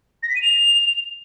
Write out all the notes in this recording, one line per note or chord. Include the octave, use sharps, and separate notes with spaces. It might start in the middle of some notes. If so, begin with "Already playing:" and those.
A#6
B6
D#7
F7